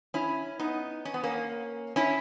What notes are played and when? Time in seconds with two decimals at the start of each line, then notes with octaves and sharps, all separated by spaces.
0.14 C#4 E4
0.60 B3 D#4
1.05 C#4
1.14 B3
1.24 A#3 C#4
1.96 C#4 E4